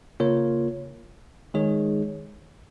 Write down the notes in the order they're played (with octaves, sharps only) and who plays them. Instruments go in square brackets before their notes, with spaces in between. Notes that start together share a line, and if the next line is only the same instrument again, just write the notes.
[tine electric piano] C#3 A#3 F4 A#4 C#5
D#3 G#3 D#4 G#4 C#5